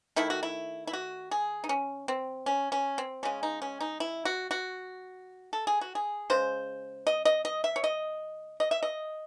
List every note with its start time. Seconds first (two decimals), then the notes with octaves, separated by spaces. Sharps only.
0.16 D#3 A3 E4
0.30 F#4
0.43 E4
0.87 E4
0.93 F#4
1.31 G#4
1.64 D#4
1.69 C#4
2.08 C4
2.46 C#4
2.72 C#4
2.98 C4
3.23 C#3 G#3 C#4
3.43 D#4
3.62 C#4
3.81 D#4
4.00 E4
4.25 F#4
4.51 F#4
5.53 A4
5.67 G#4
5.81 F#4
5.95 G#4
6.30 C#3 G#3 C5
7.07 D#5
7.25 D#5
7.45 D#5
7.64 E5
7.76 C#5
7.84 D#5
8.60 D#5
8.71 E5
8.83 D#5